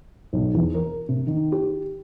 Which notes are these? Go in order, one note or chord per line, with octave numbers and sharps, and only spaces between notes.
B1
E2
A#4
C3
D#3
G4